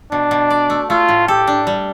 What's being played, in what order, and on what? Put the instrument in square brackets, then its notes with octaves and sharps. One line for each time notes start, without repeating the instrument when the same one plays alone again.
[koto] B2 [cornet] D4
[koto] B2
D5
A3
[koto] A3 [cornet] F4
[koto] A2
[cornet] G4 [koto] A4
[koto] D4
G3